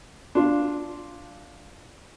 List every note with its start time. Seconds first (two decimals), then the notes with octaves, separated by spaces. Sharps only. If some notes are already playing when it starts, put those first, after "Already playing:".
0.35 D4 F4